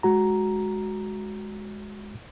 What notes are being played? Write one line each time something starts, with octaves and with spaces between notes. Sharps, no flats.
G#3 F#4 A#5